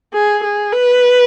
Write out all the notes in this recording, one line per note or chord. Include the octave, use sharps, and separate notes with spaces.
G#4
G#4
B4